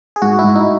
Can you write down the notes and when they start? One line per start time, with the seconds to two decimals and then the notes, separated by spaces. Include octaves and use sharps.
0.16 G#4
0.22 G#2 F#4
0.39 E4
0.44 G#2
0.55 D#4